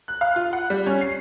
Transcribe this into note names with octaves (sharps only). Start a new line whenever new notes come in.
F#6
F5
F4
F#5
G3
C#4
C7